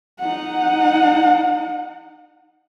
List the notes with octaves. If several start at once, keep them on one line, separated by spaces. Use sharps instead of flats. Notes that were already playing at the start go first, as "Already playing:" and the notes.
D#4 F#5